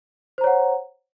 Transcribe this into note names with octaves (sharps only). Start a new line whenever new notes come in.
C5 C#5 F#5 A#5